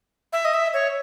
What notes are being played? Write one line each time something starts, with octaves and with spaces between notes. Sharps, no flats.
E5
D#5
E5
C#5